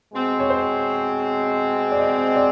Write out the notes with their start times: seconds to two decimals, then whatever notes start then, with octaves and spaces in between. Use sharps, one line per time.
0.13 B2 G#3 C4
0.39 C#5
0.50 C5
1.91 D5
1.99 D#5
2.36 D5